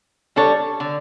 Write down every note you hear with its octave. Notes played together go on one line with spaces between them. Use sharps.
G3 D4 A4 C#5
D3